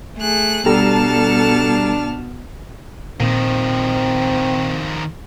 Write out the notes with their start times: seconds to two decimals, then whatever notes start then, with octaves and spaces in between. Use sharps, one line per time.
0.16 A3 G#4 F#6
0.66 B2 G3 D4 A4 A5 A#5 F6
3.20 A#2 D#3 F3 C4